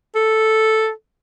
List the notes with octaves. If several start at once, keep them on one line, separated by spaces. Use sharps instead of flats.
A4